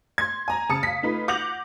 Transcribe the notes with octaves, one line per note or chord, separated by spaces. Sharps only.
C6 G#6
G#5 A#5
C#3 A5 D#6 C#7
F5 B6
A3 D#4 F4 B4
F#5 D6 G6 A#6 F7 F#7